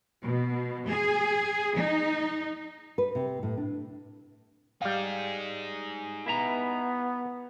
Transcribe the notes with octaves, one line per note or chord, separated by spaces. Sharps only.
B2
G#4
D#4
B4
C3
A2
D4
G3 D#4 G#4 F5
B3 E4 E5 A#5